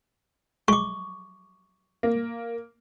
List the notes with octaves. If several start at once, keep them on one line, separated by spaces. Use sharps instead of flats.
G#3 C#6 D6
A#3